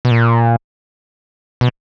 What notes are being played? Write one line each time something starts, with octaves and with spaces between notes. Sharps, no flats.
B2
A#2
B2